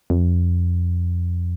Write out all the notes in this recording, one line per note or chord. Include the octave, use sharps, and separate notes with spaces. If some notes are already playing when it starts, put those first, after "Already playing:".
F2